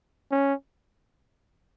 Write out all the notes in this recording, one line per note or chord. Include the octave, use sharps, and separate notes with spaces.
C#4